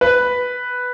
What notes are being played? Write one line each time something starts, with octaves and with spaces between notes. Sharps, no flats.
B4